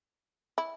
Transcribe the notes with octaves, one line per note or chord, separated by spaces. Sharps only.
E4